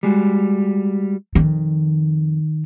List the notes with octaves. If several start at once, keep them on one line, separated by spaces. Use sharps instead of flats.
G3 G#3 F#4
F2 D#3